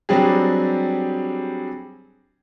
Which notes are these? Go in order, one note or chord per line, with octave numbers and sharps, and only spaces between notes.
F#3 G3 C4 D4 G4 G#4